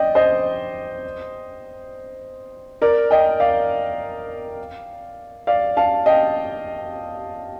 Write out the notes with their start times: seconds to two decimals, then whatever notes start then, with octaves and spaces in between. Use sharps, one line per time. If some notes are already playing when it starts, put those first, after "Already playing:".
Already playing: D5 D#5 G5
0.15 C5 D#5
2.82 A#4 D5
3.11 D#5 G5
3.40 D5 F5
5.47 D5 F5
5.77 F5 A5
6.06 D#5 G5